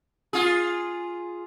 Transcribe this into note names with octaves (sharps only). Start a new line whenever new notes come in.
F4 G#4